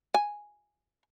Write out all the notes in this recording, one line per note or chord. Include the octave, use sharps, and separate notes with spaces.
G#5